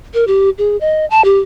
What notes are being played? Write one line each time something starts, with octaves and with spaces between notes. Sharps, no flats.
A#4
G4
G#4
D#5
A5
G4